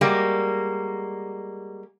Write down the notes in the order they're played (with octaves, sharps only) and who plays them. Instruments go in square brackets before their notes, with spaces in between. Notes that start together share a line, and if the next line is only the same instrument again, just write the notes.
[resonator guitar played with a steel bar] G3 G#3 A#3 F#4